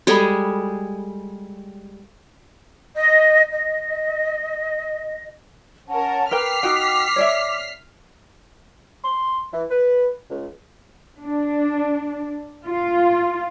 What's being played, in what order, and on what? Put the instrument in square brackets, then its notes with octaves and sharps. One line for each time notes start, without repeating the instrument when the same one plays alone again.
[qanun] G3 G#3 G#4 [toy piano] F#4 A4 B5
[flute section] D#5
D#5
[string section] C#4 A#4 [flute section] F#5 A5
[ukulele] A#4 B4 G5 [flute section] D6 [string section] F6 B6 C7
[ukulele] D#4 F#4 G5
C#5 D5 E5
[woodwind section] C6
E3
B4
C#2
[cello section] D4
F4